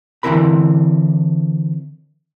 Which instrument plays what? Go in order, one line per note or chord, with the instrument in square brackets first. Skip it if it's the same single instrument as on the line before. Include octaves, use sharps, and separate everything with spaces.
[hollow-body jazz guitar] D3 E3 C4 E4 A#4 B5